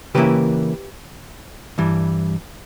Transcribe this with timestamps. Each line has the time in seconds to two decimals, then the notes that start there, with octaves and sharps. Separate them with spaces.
0.15 C#3 E3 A#3 E4 G4 B4
1.78 G2 E3 G3